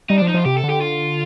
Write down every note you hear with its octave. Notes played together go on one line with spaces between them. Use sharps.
G3 D#4
F3 D4
D#4
F3 F4
C3 G4
A4
D3
G4
F4